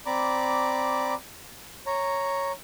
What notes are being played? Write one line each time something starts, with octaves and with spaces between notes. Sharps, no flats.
C4 D5 A#5 B5 D6
C#5 A#5